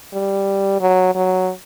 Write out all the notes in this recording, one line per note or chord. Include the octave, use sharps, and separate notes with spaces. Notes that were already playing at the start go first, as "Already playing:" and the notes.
G3
F#3
F#3